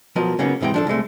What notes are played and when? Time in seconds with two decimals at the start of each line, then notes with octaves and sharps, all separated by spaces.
0.16 B1 F3 F#3 B3 A#4 D#5
0.39 C#3 F#3 A#3 B3 C#4 D#4
0.61 G#2 C3 E3 G#3 G5
0.74 F3 D4 A4
0.87 C2 C3 G#3 A3